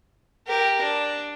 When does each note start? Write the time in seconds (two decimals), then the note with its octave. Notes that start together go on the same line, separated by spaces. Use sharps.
0.48 G4 A#4
0.82 D4